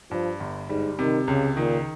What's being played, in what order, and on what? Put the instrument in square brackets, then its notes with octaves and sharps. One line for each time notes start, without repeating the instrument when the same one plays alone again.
[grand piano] G2 [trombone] F3
[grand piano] G1
[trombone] G#2 [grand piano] G3
[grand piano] C3 [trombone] D#3
[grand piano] C#2 [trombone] C#3
[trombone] A#2 [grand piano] D#3